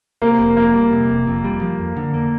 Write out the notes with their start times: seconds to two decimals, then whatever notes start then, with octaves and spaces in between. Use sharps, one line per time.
0.22 C3 A#3
0.40 F1
0.57 F2 A#3
0.74 G3
0.92 C3
1.10 F1
1.27 F2
1.45 G3
1.62 F3
1.79 F2
1.97 D3
2.14 A#3